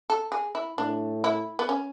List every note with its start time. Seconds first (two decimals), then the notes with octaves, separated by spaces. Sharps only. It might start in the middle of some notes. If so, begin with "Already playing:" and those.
0.10 A4
0.32 G#4
0.55 E4
0.78 A2 D4
1.24 E4
1.59 B3
1.69 C#4